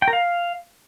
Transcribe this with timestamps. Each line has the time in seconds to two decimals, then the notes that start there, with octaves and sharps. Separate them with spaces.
0.02 G5
0.08 A#4
0.13 F5